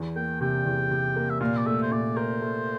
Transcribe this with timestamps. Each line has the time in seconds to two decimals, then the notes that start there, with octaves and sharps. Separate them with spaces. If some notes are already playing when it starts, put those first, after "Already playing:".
Already playing: E2
0.16 A#3 G5
0.41 C3 G5
0.65 E2
0.91 C3
1.16 A#3
1.30 E5
1.41 A#2 F5
1.57 D5
1.66 A3 E5
1.82 C5
1.91 A#2 D5
2.16 A#4 C5
2.42 A3